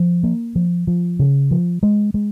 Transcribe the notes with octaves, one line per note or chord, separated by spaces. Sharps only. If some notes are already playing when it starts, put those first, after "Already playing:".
Already playing: F3
A#3
F3
F3
C#3
F3
G#3
G#3